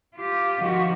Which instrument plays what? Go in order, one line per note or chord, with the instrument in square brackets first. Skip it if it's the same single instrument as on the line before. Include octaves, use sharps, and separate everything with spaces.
[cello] F4 G4
[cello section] D#3 F3 F#4